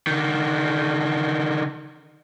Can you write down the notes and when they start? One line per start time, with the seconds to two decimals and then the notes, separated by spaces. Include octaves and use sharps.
0.07 D3 D#3